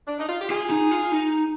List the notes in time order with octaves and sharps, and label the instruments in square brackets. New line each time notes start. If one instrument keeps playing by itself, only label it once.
[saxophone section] D4
D#4
F4
G4
[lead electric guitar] F4 [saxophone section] G#4
[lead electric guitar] D#4
F4
D#4